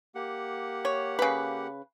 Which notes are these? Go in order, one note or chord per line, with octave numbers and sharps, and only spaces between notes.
A#3 G4 F#5
C#5
C#3 B4